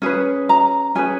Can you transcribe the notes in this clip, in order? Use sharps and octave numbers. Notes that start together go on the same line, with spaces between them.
C#4 G#4 B4
A#5
C#4 G#4 B4 G#5